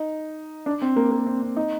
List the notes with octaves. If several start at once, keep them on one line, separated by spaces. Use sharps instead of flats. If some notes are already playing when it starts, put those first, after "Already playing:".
Already playing: D#4
D4
C4
A#3
A#3
C4
C4
D#4